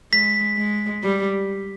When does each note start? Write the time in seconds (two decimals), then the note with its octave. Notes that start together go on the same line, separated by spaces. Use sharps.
0.12 G#3 B6
0.57 G#3
1.03 G3